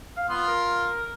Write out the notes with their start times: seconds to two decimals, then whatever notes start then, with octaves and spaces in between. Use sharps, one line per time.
0.17 F5
0.29 B3 F4 C6
0.48 A#4